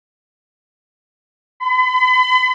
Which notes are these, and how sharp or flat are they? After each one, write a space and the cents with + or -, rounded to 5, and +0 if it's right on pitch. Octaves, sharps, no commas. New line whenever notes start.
B5 +40